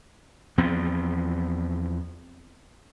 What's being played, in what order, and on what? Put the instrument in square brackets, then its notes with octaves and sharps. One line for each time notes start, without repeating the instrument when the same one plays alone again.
[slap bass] E2 F3 B3 C4